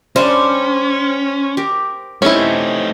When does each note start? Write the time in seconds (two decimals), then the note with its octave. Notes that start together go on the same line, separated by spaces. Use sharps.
0.16 G3 C#4 D4 C5
1.57 G4 A#4
2.22 C3 A3 C#4 D#4 E4 A5